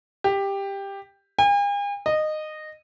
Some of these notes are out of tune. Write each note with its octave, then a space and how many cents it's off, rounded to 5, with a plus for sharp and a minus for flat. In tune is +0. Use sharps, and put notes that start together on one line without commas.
G4 +10
G#5 -45
D#5 -15